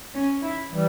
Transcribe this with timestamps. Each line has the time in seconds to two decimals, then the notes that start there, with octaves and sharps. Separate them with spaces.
0.14 C#4
0.43 E4
0.72 E3 G3